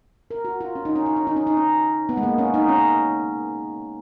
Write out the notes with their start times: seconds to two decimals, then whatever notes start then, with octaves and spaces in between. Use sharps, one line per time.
0.31 A#4
0.45 F#4
0.61 F4
0.75 C#4
0.85 D#4
0.96 C#4
1.06 D#4
1.16 C#4
1.27 D#4
1.36 C#4
1.47 D#4
1.57 C#4
2.09 B3
2.17 G#3
2.23 A#3
2.38 C#4
2.54 D#4
2.68 C#4